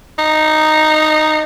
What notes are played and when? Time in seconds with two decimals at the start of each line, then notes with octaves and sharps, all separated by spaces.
0.19 D#4